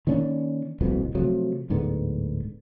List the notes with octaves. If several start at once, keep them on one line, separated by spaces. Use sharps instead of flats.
D#3 A#3 C#4 D4
D#1 C2 F2 B2
C3 F3 F#3 A3
D1 G#2 D3 B3